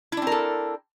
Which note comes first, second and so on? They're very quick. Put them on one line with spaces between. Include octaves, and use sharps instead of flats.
E4 D4 C4 A#4 A4